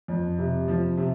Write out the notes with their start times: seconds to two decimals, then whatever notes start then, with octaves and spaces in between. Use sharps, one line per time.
0.08 F2
0.38 C3
0.68 F3
0.97 C3